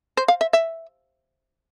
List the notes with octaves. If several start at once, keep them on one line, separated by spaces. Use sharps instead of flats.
C5
F5
E5
E5